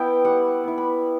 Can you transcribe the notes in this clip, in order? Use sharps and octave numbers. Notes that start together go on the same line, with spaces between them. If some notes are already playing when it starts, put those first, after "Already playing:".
Already playing: B3 E4 G5
G3 F#5
B3 E4
B5